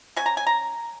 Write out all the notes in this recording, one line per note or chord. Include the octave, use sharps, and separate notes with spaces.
F#3 C#4 G#5
A#5
G#5
A#5